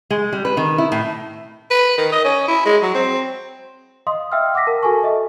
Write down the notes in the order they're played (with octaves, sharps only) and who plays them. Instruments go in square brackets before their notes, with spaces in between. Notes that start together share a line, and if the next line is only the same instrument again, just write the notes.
[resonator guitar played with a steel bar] G#3
G3
B4
D#3
E4
A2
[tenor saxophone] B4
D#3
D#5
C#4
E4
G#3
F#3
C4
[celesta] D#5 F5 C6 D#6
E5 F5 G5 E6 F6
F#5 D6 E6 A#6 B6
A#4 A5
F#4 A4 G#5 A5 C#6
A4 D#5 E5 C#6